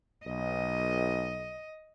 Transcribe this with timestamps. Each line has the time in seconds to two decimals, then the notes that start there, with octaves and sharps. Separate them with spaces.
0.26 B1 D#5